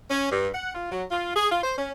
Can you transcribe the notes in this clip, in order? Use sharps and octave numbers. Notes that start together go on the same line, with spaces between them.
C#4
G2
F#5
F4
F#3
F4
G#4
F4
C5
C#4